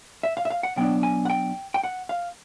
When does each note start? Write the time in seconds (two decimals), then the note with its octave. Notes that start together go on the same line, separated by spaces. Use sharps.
0.23 E5
0.37 F5
0.45 E5
0.50 F5
0.63 F#5
0.76 B2 F#3 B3 D4 G5
1.03 G#5
1.25 F#5
1.30 G5
1.74 G5
1.83 F#5
2.09 F5